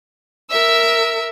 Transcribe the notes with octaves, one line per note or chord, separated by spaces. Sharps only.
A#4 E5 E6